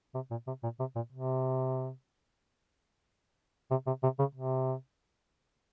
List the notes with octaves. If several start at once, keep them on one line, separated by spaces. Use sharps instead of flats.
C3
A#2
C3
A#2
C3
A#2
C3
C3
C3
C3
C#3
C3